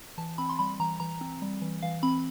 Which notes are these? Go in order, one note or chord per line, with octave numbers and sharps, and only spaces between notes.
E3 A5
C4 B5
C6
G3 B5
E3 A#5
E3 A#5
C4
G3
E3
E3 F5
C4 B5